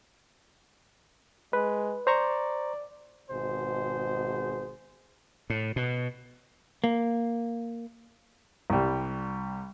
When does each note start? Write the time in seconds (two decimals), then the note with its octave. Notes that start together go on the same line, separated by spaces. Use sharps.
1.53 G#3 B4
2.07 C5 D5 A#5 C#6
3.30 G#1 B2 G#4 C5
5.50 A2
5.76 B2
6.84 A#3
8.70 C2 G3